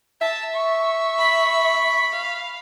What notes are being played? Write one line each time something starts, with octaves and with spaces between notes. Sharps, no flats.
E5 A5
C#6
B5
F5